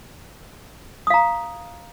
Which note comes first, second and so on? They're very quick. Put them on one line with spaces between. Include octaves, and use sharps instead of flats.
D#6 F5 A#5